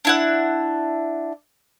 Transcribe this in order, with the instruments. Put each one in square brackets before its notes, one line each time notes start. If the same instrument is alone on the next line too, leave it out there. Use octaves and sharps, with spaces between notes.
[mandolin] D4 E4 F#5